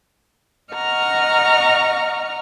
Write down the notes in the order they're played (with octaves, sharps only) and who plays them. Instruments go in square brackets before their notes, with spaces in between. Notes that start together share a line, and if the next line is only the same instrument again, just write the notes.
[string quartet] D#5 F#5 A#5 C#6 F6